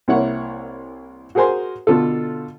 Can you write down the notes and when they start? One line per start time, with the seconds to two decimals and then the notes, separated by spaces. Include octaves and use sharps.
0.08 C2 A#3 E4 C#5 F#5
1.35 F#4 G#4 A#4 C5 G#5 C6
1.87 B2 D3 F4 A4